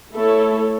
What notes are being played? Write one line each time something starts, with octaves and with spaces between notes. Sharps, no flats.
A3 E4 A4 C#5